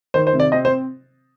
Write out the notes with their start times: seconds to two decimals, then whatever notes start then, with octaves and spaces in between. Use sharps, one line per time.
0.14 D#3 C5
0.27 C5
0.33 C3
0.40 D5
0.52 C4 D#5
0.65 C5